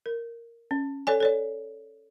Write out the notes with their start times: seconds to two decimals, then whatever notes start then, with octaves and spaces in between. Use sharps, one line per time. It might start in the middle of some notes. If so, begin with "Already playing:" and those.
0.06 A#4
0.71 C#4
1.07 A4 C#5 D5 G#5
1.20 A4 C#5 D5